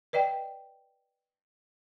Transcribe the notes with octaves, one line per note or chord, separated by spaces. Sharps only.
B4 D5 D#5 G5